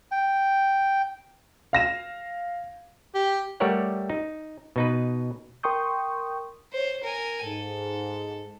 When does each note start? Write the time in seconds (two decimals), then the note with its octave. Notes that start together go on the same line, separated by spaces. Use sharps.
0.11 G5
1.73 F5 A#6 E7
3.14 G4
3.60 G3 A3 G4 A#4 C#5 F#5
4.10 D#4
4.76 B2 D#4 B4
5.63 A#4 G5 C6 C#6 D#6 G6
6.73 C5 C#5
7.03 A#4 G#5
7.44 G#2 A4